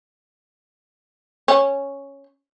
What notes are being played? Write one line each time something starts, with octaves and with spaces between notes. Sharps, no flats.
C#4